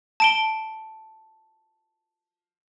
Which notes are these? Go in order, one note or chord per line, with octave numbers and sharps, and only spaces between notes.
A5 D7 G7